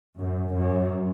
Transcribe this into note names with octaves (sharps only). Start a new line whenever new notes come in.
F#2
F#2